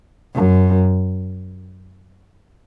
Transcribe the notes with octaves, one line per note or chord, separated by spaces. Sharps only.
F#2